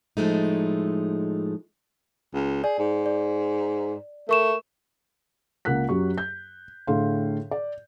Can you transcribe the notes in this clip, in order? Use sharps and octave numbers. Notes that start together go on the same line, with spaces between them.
A2 F3 G#3 A3 D#4
C#2
G#4 D5
G#2
D5
A3 A#4 C#6 E7
C#2 A#3 F#5 F#6 B6
F#2 F#3 G4 C#6
G6
A2 D3 G#4 F5 C6
D5